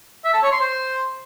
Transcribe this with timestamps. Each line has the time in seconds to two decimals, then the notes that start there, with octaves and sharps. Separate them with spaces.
0.24 E5
0.33 A5
0.42 C#5
0.51 C6
0.60 C5